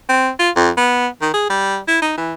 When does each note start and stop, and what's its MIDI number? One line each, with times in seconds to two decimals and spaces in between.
0.09 0.31 60
0.39 0.50 65
0.56 0.70 41
0.77 1.07 59
1.21 1.29 51
1.34 1.49 68
1.50 1.77 55
1.88 2.02 64
2.02 2.15 63
2.17 2.33 52